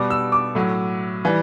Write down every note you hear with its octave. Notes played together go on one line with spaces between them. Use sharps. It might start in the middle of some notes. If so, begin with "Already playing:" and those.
Already playing: B2 G3 D6
E6
D6
A2 F#3
E3 G3